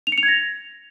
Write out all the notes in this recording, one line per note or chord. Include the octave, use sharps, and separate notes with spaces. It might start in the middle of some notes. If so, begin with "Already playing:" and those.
F7
C#7
F7
G#6
A#6